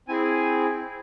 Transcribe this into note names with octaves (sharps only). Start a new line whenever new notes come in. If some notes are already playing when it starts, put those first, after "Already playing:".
C4 E4 G#4 G#5